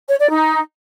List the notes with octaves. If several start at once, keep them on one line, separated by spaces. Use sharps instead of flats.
C#5
D5
D#4